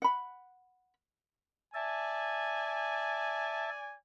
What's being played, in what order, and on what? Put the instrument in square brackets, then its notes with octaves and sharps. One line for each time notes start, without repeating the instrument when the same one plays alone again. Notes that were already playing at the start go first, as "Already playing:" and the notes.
[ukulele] F#5 B5
[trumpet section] D5 G#5 [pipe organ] E5 A5